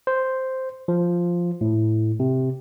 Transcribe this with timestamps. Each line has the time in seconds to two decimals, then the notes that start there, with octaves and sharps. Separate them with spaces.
0.07 C5
0.88 F3
1.61 A2
2.20 C3